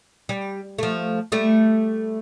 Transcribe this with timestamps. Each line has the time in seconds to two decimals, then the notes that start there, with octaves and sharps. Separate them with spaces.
0.29 G3
0.79 F3 A3
1.32 G3 A3